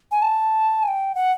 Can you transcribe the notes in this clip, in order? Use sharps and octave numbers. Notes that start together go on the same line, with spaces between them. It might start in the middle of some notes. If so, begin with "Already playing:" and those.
G#5
A5
G#5
G5
F#5